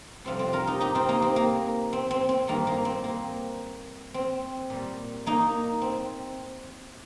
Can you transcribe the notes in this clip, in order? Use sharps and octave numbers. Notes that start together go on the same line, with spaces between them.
F2 C3 G3 C4 F4
C4 F4
F4 A#4
D#4 G4
D#4 G4
C4 F4
A#3 D#4
C4
A#3
C4
C4
C4
G2 D#3 G3 A#3
A#3
C4
A#3
C4
A#2 G3
A#3 D#4
C4